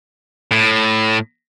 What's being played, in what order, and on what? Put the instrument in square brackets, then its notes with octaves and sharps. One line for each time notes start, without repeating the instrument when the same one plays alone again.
[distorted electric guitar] A2